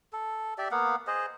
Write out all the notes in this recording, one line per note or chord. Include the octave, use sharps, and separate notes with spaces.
A4
G4 D5 E5
A#3 B3 F5 F#5
G#4 C5 D#5